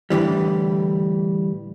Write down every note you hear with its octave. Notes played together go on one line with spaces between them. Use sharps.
A2 D3 E3 G3